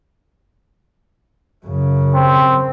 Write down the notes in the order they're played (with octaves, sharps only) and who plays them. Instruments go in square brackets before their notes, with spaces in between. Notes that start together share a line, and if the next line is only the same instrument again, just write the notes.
[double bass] F#2 C#3
[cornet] C4